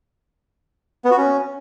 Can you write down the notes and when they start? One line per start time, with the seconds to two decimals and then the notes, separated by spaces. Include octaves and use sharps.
1.05 B3
1.11 F#4
1.18 C#4